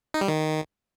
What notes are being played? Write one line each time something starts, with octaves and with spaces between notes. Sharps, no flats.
D#4
G3
D#3